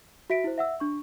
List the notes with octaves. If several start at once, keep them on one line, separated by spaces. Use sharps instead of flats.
F#4 E5 B6 D7
E4 C5
E5 F#5 E6
D4 C#6